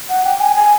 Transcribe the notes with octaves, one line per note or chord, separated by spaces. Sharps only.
F#5
G5
G#5
G#5